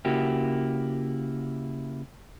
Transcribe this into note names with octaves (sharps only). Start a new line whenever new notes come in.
C#3 A#3 E4 F#4 G4